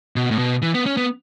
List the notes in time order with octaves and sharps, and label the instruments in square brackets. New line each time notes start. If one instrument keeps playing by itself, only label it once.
[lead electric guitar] B2
A2
B2
E3
B3
C#4
B3